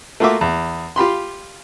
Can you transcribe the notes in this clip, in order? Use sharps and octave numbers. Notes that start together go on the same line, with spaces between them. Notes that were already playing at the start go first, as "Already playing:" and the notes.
A3 A#3 F4 F#4 E5 D6
E2
F4 G4 B5 C6